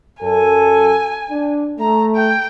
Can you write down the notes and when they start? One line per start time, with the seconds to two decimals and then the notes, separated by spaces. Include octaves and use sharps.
0.23 F#2 A4 G#5
1.31 D4
1.79 A3 A#5
2.15 G5